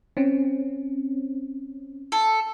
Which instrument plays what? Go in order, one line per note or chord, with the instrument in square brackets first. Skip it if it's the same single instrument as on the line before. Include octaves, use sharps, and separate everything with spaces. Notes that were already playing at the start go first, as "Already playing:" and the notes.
[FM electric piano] C4 C#4
[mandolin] A4